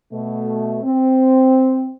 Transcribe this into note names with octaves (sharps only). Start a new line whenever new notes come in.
B2 A3
C4